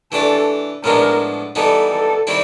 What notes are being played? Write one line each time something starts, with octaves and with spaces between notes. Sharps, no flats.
E3 A3 D4 G4 A4
A2 F3 G#3 B3 D4 A#4
E3 G3 B3 D#4 A4
A4
D#3 G3 C4 E4